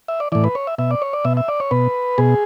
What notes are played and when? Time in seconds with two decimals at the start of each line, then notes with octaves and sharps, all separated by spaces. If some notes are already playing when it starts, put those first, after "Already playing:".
0.08 E5
0.20 D5
0.32 A2 E3 D5
0.44 B4
0.55 C#5
0.67 E5
0.78 B2 E5
0.91 D5
1.02 C#5
1.13 D5
1.25 B2 E5
1.37 E5
1.48 D5
1.60 C#5
1.71 B2 B4
2.18 B2 G#4